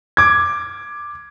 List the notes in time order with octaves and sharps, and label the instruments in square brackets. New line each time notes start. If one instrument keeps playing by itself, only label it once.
[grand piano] D6 G#6